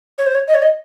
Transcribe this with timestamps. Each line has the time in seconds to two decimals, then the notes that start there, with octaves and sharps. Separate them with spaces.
0.18 C#5
0.26 C5
0.34 C#5
0.47 D#5
0.54 C#5
0.62 D#5